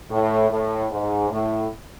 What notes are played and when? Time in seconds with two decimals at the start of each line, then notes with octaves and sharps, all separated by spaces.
0.10 A2
0.50 A2
0.90 G#2
1.30 A2